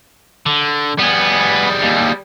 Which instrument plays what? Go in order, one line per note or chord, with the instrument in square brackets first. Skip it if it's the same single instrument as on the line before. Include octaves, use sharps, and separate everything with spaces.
[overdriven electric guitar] D3
[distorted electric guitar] G3 G#4 [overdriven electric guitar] B3
[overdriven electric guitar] D#2